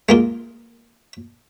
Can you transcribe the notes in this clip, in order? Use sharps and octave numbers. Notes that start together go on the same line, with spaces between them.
G#3 A#3 F4